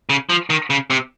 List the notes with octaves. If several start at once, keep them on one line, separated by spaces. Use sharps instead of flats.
C#3
F3
D#3
C#3
C3